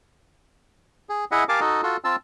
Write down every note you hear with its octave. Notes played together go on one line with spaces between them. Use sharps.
G#4
E4 G#4 D#5 E5 F#5
G4 A#4 F5 G#5 A5 D6
D#4 F#4 A4 D#5
F4 F#4 A4
C4 F4 A5 E6